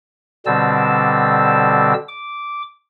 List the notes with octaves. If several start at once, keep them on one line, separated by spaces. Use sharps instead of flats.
B2 D3 G3 C4 A5 E6
D6